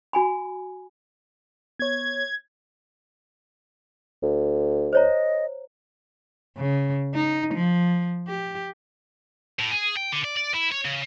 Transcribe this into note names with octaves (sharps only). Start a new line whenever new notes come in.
F#4 G#5 B5
B3 C#5 G#6
D2
C5 C#5 D#5 A#5
C#3
D#4
F3
G4
A2
G#4
G5
D3
D5
D5
E4
C#5
C#3